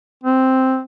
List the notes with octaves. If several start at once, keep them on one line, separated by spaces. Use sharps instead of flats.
C4